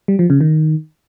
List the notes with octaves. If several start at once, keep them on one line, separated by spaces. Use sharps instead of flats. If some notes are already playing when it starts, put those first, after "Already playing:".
G3
F3
C#3
D#3